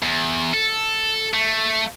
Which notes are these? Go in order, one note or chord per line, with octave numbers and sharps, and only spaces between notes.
E2
A4
A3